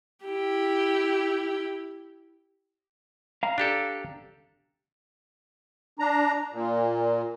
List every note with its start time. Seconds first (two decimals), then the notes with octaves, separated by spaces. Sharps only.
0.25 E4 G4
3.43 F5 A#5
3.58 D4 G4 A4
5.99 D4 A#5
6.53 A#2